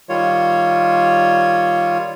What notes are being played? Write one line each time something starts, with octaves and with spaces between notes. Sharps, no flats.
D#3 G3 F4 C#5